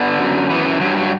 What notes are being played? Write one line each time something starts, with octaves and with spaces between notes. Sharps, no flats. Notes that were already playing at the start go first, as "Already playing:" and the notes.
Already playing: D3 B3
F#2
E3 B3
E3
G2 F#3
F#3